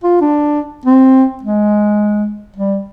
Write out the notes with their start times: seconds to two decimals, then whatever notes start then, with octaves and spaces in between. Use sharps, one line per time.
0.03 F4
0.21 D4
0.85 C4
1.43 G#3
2.56 G3